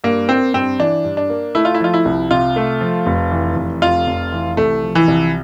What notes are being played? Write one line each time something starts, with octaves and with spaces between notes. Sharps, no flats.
G2 A#3
A#3 C4
G2 C4
E3 D4
G2
D4
A#3
A3 E4
F4
E4
F3 F4
E4
C2
C3 F4
A3
F3
F1
E3
F1
F2 F4
F1
E3
C2 A3
F3
E3
C2